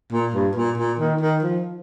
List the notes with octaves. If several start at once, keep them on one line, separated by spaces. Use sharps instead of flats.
A#2
G2
A#2
A#2
D#3
D#3
F3